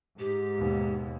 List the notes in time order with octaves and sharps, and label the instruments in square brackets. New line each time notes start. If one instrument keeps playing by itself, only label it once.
[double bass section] G#2 [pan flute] G4
[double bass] D#2 B2